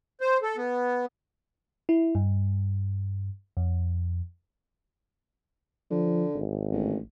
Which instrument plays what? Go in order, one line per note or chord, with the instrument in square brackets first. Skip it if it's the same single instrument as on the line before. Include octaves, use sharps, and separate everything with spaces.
[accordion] C5
A4
B3
[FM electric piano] E4
G2
F2
[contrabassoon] D3 [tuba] F3
[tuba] G#1
[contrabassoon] A1